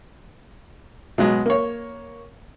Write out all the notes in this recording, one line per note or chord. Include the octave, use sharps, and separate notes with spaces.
B2 F#3 G#3
A#3 C#5